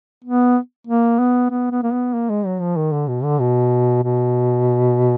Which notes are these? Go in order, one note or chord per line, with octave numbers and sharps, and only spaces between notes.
B3
A#3
B3
B3
B3
A#3
B3
A#3
G#3
F#3
F3
D#3
D3
B2
D3
B2
B2